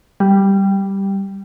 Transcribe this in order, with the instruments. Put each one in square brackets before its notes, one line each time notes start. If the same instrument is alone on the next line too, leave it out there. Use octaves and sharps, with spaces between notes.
[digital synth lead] G3